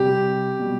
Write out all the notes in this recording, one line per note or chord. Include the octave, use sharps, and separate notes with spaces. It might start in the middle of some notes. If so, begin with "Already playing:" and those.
Already playing: C3 G3 G4
B2 G3